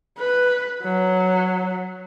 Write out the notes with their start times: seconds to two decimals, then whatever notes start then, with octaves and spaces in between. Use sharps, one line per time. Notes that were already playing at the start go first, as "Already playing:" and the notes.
0.18 B4
0.83 F#3